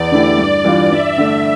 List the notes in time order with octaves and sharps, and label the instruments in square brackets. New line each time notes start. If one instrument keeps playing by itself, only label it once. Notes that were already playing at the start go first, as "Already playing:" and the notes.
Already playing: [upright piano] E2 [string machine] D5
[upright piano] D3 A3 E4 G4
[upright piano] G2 [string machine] D5
[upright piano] E3 G3 D4 F4
[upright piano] G2 [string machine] E5
[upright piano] D3 A3